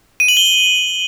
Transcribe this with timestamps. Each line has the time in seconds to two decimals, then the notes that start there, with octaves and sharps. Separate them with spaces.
0.20 D#7
0.28 F#7
0.37 G7